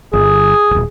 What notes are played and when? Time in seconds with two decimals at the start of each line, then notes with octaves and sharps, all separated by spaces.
0.13 G1 G#4
0.71 D#1 G#1